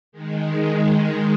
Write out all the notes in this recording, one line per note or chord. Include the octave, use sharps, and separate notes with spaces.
D#3 G#3
D#3 G#3